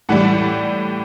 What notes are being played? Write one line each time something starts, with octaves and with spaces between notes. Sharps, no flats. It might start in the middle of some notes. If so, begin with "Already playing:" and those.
A2 E3 G3 F#5